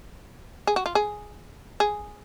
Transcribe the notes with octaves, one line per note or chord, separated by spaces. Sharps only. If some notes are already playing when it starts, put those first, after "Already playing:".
G#4
F#4
F4
G#4
G#4